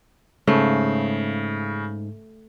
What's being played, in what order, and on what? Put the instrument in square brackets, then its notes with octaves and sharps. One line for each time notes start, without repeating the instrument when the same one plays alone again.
[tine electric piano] G#2 [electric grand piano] C#3 [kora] A3